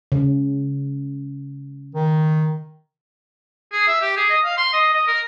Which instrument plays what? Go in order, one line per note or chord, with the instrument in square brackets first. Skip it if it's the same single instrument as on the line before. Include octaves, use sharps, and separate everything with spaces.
[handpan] C#3
[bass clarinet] D#3
[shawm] G#4
E5
G4
G#4
D#5
F5
C6
D#5
D#5
A#4